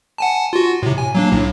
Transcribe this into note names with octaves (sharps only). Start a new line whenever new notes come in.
F#5 G#5 A5
F4 F#4
A2 C3
G#5
F#3 A#3 D4
B1 A2